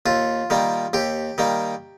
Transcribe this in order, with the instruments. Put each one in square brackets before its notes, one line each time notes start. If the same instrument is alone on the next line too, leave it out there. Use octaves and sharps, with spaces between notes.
[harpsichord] D#2 F4
D#3 G3 A#3
D#2 G4
D#3 G3 A#3